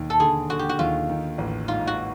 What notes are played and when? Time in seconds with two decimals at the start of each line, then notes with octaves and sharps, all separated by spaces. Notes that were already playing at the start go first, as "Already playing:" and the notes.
Already playing: E1 D#2
0.10 A4
0.20 D3 G#4
0.50 D3 F#4
0.59 G4
0.69 F#4
0.79 D#2 F4
1.10 D#3
1.38 A1
1.68 G#2 F4
1.87 F#4